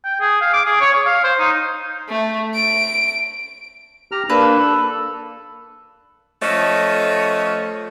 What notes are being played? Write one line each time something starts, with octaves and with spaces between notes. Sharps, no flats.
G5
G#4
F5
D6
G#4
C#5
C#5
F5
C5
D#4
A3
D7
G4 A#5 F6
A#3 D4 B4 E6
A4
F3 A3 C#4 A4 C#5 D#5